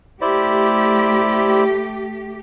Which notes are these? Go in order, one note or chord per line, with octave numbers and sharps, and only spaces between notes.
A3 E4 G4 C5 D5